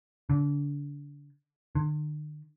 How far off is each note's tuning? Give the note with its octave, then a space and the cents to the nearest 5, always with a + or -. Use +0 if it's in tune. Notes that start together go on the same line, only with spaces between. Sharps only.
D3 -30
D3 +45